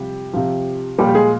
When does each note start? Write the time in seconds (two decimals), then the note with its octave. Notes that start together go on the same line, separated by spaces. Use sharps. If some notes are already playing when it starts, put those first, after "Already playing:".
Already playing: C3 F3 G3 G4
0.33 C3 F3
0.99 A#2 F3 G3 G4
1.09 G4
1.15 G#3 G#4